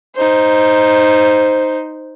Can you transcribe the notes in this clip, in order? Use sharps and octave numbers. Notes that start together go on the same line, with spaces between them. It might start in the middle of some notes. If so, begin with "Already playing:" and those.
D#4 C5